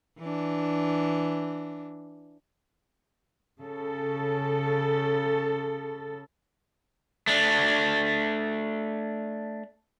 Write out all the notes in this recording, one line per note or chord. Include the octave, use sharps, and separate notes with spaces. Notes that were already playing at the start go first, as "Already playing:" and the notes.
E3 D4
C#3 A4
A3 D4